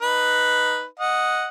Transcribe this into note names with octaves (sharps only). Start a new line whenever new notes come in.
D#4 B4
D#5 F#5